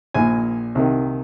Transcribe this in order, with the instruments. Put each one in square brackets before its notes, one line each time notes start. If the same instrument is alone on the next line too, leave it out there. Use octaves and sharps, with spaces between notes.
[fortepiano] A#1 A#2 G#5
C2 C3 D#3